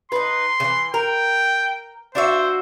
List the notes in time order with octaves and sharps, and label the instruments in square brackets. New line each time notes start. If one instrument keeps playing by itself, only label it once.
[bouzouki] D#4 B4 [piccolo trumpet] C6
[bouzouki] C#3 E3
[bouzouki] A#4 [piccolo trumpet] G5
[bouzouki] D4 F#4 E5 [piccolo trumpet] C5